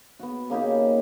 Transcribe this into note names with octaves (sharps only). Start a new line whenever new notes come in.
B3 F#4
C#3 A#3 D#4 G4